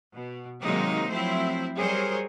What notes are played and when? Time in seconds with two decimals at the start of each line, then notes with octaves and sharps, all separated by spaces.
0.14 B2
0.61 C3 D#3 F#3 G#3 A#3 D#4
1.10 F3 F#3 A3 C4 E4 C5
1.76 F#3 G3 G#4 A#4 C5 C#5